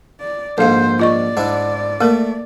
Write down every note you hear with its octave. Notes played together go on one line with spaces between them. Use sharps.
D5
A#1 G#2 A4 C5 F5
F4 D5 D#5 C#6
G#2 D4 E4
A3 A#3 A#4